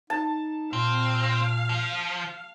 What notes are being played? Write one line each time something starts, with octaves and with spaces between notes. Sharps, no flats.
D#4 A5
A#2 C4 F5
F3